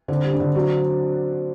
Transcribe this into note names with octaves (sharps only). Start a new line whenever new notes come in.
D3 C4
G3
D4
D3
F#3 D4